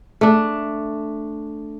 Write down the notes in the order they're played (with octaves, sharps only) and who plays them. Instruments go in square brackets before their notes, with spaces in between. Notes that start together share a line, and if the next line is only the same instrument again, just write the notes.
[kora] A3 D4